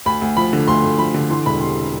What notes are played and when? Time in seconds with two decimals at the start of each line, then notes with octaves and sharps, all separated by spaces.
0.06 D2 B5
0.22 D2
0.37 F3 B5
0.53 D3
0.68 D2 C6
0.84 D2
0.99 F3 B5
1.14 D3
1.30 E3 C6
1.46 E1 B5
1.61 C3 C6